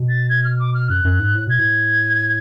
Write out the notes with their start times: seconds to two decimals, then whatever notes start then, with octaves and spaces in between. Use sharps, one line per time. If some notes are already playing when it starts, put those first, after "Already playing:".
Already playing: B2
0.09 A6
0.29 G#6
0.44 F6
0.59 D6
0.74 F6
0.89 F#2 F#6
1.05 F#2
1.19 G#2
1.35 A2
1.47 B2 G#6
1.59 A2